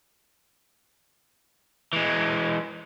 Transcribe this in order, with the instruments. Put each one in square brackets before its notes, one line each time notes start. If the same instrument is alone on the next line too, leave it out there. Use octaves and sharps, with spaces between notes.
[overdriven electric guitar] E3 G#3